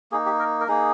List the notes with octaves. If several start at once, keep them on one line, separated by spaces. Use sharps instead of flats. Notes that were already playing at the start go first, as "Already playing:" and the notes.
A#3 D#4 G#4
G4
A#4
A#4
A#3 D#4 G#4